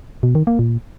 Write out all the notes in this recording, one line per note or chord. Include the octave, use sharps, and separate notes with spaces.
B2
D#3
A#3
A#2